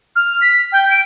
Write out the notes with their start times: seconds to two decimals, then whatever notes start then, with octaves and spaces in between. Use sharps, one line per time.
0.16 F6
0.41 B6
0.72 G5
0.90 D7